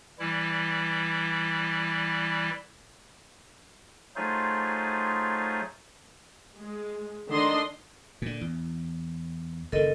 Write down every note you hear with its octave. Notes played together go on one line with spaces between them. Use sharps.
E3 G3 E4
F#3 A3 D#4 F4 G#4 C5
G#3
D3 D#3 D4 D5 D#5 C6
A#2 D3
E2
F#1 D#3 A4 A#4 D#5